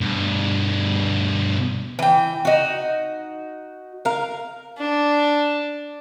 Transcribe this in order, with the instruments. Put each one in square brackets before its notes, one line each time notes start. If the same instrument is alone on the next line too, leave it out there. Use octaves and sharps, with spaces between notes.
[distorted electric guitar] G2 B2
[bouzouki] E3 G5
D#4 F#4
A#4 F5
[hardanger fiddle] D4